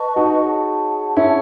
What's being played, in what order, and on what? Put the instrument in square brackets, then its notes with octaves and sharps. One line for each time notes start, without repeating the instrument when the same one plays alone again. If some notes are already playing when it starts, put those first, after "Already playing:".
Already playing: [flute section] B4 D#5 A5 C#6
[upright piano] D#4 F#4
[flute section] G#4 C#5 F#5 A5
[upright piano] C#4 E4